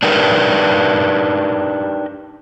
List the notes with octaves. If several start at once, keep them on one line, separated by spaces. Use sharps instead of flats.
D4 D#4 G4 A#4 B4